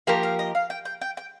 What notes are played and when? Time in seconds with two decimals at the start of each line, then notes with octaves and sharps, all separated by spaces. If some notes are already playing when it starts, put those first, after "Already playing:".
0.07 F3 A#3 G4 A#4 F5
0.23 F5
0.39 D#5
0.55 F5
0.70 G5
0.85 G5
1.02 G5
1.17 G5